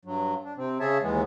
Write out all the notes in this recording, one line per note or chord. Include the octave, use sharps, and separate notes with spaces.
G2 F#3
D4
C3 C4
C#3 G#4 C#5 E5 A5
D#2 E3 G#3 B3